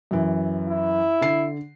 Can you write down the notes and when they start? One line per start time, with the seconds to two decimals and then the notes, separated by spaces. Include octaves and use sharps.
0.11 F#2 E3
0.68 E4
1.21 D3 C7